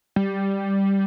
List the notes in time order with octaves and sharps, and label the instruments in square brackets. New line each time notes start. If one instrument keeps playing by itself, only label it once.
[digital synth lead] G3